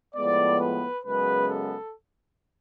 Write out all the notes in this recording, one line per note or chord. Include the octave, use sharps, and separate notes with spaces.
A2 F3 G#3 B3 D5
B4
F#2 C#3 G#3 B3 B4
A4